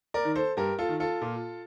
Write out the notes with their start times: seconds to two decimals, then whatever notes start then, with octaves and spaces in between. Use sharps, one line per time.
0.14 A#4 D5
0.25 D#3
0.35 A4 C5
0.57 G2 G4 A#4
0.79 F4 A4
0.89 D#3
1.00 F4 A4
1.22 A#2